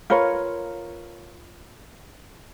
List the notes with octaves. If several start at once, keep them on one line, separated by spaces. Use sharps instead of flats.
F4 A#4 B4 C#5